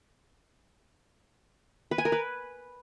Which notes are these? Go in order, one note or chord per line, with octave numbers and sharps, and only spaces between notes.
B4
G#5
A#4
B4